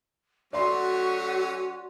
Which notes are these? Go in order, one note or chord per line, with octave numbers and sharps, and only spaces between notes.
F#3 A3 C#4 F#4 D5 C6